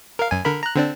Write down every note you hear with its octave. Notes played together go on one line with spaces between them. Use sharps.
A#4 F5
F#2 G#5
D3 A#4 B5
A#5 F#6
D3 C4 D4